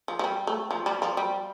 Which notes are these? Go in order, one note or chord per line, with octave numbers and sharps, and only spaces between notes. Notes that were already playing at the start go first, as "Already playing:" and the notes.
F3
F3
G3
A3
F3
G3
F3
G3